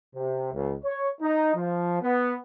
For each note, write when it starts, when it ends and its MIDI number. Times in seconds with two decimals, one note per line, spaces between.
0.15 0.51 48
0.53 0.74 37
0.84 1.09 73
1.21 1.54 63
1.55 2.00 53
2.02 2.35 59